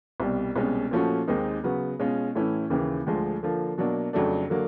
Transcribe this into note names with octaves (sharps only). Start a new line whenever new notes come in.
C2 B2 G3
C2 B2 G#3 C#4
A#2 F3 A3 C#4 F#4
D#2 D#3 G#3 C4 D#4
C#3 F#3 B3
B2 G#3 C#4 F4
A2 E3 A3 C#4 E4
D#2 C#3 E3
D2 D3 F3 G#3
D3 F3 A#3
B2 F#3 A#3 D4
F2 C#3 F#3 A3 D4
D3 F#3 A#3